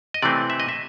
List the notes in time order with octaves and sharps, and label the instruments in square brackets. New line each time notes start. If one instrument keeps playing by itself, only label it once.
[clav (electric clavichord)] D#5
C3 E3 A3 C4 D5
E5
D#5
E5